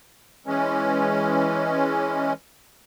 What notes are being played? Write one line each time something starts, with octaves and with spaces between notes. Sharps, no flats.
E3 G#3 C#4